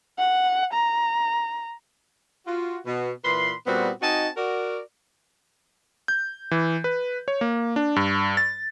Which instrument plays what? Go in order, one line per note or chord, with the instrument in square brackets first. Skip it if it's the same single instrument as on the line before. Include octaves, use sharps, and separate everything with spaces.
[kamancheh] F#5
A#5
[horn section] F4 F#4
B2
A#2 E3 B4 B5 C6
A#2 G3 B3 C4 F#4
C4 D#4 F#4 D#5 G#5 A5
F#4 A#4 D5
[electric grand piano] G6
E3
B4
C#5
A#3
D4
G2
A6